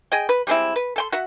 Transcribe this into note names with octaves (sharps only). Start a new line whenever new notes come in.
G#4 D#5 G5
B4
G3 G#3 C4 E4
B4
A4 G5 C6
F#4 E5 F#5